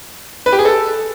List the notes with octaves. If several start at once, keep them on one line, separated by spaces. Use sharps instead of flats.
B4
G4
G#4
A4